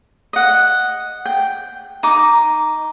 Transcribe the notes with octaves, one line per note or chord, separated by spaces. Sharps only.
D#5 F#5
G5
D#4 D6